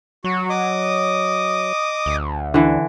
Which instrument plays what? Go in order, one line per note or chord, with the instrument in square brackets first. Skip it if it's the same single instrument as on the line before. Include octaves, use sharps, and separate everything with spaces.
[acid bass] F#3 [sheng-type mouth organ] F#4
[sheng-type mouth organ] D#5 D6 D#6
[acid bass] D2
[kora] D3 E3